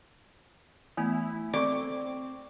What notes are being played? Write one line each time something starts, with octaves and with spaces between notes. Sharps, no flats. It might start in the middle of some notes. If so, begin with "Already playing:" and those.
E3 A3 B3 E4 G#5
C4 A4 D5 C#6 D6